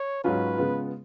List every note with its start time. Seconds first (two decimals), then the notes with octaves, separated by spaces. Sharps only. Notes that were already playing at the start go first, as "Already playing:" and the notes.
Already playing: C#5
0.24 G#2 F#3 C#4 F4 B4
0.58 C#3 G#3 B3 F4